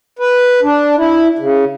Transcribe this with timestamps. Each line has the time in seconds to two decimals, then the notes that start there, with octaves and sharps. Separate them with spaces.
0.19 B4
0.63 D4
0.97 E4
1.39 C#3